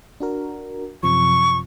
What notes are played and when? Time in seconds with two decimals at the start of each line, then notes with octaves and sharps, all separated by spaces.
0.20 D4 F#4 A#4
1.03 F#2 C3 F3 C#6